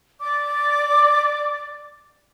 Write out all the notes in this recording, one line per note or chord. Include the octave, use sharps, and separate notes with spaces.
D5 D6